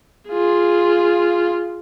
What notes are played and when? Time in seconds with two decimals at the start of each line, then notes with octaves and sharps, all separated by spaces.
0.29 F4 G#4